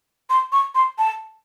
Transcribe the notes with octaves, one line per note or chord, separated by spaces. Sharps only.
C6
C#6
C6
A5